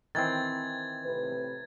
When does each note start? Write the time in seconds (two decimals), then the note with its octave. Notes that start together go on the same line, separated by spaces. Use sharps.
0.15 D#3 E3 C4 G#6 A6
1.04 A2 C3 B4